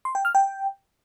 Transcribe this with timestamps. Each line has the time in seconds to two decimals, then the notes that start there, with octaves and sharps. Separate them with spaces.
0.05 C6
0.15 G5
0.25 F6
0.35 G5